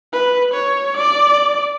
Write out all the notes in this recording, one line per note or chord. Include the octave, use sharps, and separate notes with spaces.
B4
C#5
D5